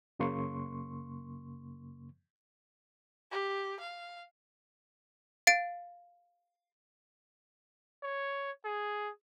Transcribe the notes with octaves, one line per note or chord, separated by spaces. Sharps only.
F#2 C#3 A#3 C6 C#6
G4
F5
F5 A6 D7
C#5
G#4